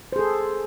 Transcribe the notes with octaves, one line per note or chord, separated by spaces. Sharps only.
G#4 A4 C5